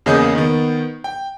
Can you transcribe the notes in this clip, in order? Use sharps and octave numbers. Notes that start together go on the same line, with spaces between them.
E2 C#3 A#3 D#5 D#6 G6
D#3 B3
G5